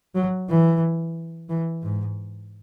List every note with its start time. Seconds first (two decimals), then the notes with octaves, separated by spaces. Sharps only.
0.15 F#3
0.49 E3
1.49 E3
1.83 G#2